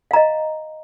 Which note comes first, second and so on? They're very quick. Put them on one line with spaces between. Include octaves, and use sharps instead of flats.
F5 A#5 D#5